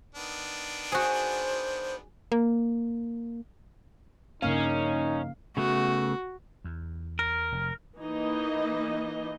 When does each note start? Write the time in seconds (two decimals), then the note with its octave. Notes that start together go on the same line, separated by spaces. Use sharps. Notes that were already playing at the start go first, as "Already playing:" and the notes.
0.15 D#3 B3 D4
0.92 F#4 G#4 C5
2.32 A#3
4.42 G2 C#3 F3 A#3 C#4 D#4 F5
5.57 C#3 A3 B3 F#4
6.64 E2
7.19 A#4
7.52 F1
8.03 E3 A#3 D#4 D#5